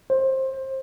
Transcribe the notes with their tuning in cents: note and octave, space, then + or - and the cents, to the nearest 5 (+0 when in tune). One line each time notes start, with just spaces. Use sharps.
C5 +20